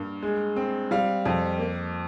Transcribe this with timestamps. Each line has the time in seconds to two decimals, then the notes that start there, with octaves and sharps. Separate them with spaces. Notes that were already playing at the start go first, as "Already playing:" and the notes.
Already playing: G2 A#3
0.22 G#3
0.56 C4
0.91 G3 F5
1.26 F2
1.59 A#3